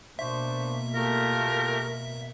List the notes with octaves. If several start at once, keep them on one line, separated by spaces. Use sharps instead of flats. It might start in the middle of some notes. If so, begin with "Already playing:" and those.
B2 A#3 D4 C5 E5 C#6
A3 F4 G4 A#4